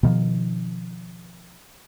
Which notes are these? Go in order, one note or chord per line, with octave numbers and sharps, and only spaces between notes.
B2 D#3 F3